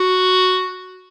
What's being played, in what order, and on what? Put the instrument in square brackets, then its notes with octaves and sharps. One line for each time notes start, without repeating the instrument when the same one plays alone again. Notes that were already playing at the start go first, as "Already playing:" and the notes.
Already playing: [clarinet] F#4